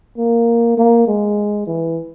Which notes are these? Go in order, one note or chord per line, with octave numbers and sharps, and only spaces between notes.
A#3
A#3
G#3
E3